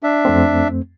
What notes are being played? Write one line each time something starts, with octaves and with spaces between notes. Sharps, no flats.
D4 E5
F2 A3 C4